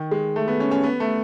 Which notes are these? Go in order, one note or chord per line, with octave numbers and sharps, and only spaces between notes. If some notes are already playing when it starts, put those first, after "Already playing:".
Already playing: D#3
G#3
A3
B3
C#4
C#4
B3
A3